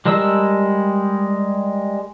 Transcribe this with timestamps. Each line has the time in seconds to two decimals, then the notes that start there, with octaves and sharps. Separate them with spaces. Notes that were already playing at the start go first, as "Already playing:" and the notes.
0.05 G3 G#3 A#4 A5 E6